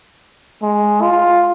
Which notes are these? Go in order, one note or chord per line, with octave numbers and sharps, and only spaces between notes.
G#3
F4